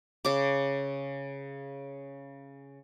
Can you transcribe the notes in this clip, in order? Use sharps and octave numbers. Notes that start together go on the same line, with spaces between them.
C#3 D6